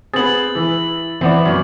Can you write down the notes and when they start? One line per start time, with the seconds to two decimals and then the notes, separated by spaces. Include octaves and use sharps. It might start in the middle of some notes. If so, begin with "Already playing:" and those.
0.14 B3 C4 G#4 A6 F#7
0.55 E3
1.21 E3 B3 C4 D5
1.45 F#2